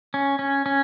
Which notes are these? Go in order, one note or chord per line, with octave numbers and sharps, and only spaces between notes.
C#4
C#4
C#4